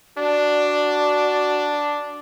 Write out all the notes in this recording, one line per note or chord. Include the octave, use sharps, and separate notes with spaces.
D4 F#4 D5